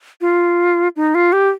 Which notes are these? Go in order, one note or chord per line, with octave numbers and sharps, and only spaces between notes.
F4
D#4
F4
G4